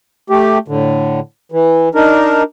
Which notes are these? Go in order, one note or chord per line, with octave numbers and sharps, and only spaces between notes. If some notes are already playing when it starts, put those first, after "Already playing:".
A3 G4
A2 D3
E3
D4 D#4 A#4